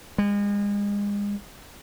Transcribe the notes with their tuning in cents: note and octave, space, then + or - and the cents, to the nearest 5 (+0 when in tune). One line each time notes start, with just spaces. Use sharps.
G#3 -35